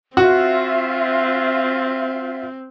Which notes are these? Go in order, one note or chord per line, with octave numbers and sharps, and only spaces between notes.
C4 F4 F#4 E5